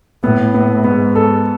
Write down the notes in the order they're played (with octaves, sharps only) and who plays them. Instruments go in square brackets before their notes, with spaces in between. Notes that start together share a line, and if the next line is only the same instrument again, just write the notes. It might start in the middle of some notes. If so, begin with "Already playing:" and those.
[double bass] A2 [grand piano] B3
[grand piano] B3
[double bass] G#2 [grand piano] B3
[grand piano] A4